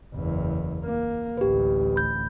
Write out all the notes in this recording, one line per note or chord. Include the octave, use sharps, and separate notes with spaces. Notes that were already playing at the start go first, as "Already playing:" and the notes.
F#1 E2
A#3
A1 D2 G4 B4
B5 G6